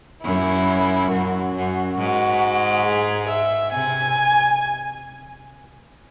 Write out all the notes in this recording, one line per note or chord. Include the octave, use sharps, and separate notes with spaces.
F#2 E4
F#2 F#4
F#2
G#2 F#4
G#4
E5
C3 G#5